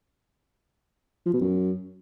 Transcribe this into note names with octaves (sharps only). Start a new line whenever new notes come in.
F3
B2
F#2